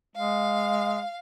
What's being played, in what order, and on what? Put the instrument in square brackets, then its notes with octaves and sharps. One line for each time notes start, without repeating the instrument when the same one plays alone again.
[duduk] G#3 [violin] F5